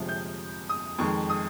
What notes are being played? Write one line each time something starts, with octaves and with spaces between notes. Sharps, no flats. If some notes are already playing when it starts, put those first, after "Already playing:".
Already playing: G1 F2 C3 F3 G#3
G6
D#6
F2 D#3 G#3 C#6
D#6